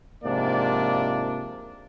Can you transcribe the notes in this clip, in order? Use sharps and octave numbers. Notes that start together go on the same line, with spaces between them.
G#2 C3 F3 A#3 D4 D5